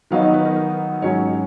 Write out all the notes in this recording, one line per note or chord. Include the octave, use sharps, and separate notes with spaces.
D#3 F#3 B3 D#4 F5
D#5
B4
A#4
A#4
G#2 F#3 C#4 C#5